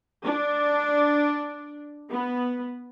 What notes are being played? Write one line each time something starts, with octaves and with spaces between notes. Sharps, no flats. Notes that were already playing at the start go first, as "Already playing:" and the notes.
D4
B3